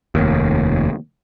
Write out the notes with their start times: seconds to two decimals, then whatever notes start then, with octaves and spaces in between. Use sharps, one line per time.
0.15 F1 D#2